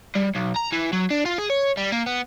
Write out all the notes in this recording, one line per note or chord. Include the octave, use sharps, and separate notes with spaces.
G3
B1
A#5
E3
F#3
D4
F4
G#4
C#5
G3
A#3
B3